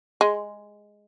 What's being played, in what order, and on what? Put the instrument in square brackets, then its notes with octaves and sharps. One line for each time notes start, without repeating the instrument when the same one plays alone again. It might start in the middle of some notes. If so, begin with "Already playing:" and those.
[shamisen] G#3